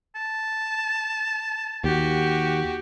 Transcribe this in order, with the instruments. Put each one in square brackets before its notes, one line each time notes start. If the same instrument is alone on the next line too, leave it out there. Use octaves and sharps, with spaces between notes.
[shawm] A5
[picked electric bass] D#2 [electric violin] F#4 G4